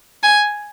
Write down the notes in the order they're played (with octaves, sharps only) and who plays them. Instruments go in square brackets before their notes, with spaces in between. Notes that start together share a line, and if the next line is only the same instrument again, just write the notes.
[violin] G#5